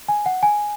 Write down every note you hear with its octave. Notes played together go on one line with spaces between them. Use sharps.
G#5
F#5
G#5